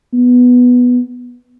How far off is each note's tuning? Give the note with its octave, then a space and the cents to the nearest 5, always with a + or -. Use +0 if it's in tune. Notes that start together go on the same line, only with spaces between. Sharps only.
B3 +0